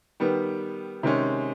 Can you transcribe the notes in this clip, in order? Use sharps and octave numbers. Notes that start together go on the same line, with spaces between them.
D#3 G3 B3
C3 D#3 G#3 C#4